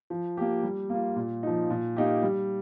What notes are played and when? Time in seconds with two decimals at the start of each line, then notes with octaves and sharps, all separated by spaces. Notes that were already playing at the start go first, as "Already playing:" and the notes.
0.10 F3
0.37 A#3 G4
0.63 G3
0.90 A#3 F4
1.16 A#2
1.43 F3 D#4
1.70 A#2
1.97 A#3 D#4 G4
2.22 G3